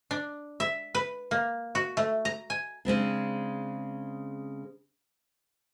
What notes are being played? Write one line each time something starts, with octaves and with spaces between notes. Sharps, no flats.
D4
E5
B4
A#3
F#4
A3
A#5
G#5
C#3 G#3 C4 D4